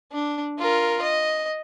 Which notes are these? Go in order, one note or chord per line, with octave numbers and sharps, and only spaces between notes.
D4
F4 A#4
D#5